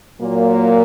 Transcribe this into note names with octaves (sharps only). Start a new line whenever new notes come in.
A#2 F#3 A#3